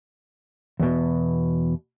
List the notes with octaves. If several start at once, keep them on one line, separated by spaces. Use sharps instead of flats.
E2 B2